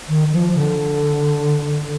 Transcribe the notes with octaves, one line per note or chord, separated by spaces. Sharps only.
D#3
F3
D3